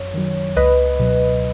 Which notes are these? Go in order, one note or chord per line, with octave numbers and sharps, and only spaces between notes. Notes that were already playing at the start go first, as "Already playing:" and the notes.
Already playing: F#2 C#5
D#3 F#3
C#2 B4 D#5
B2 F#3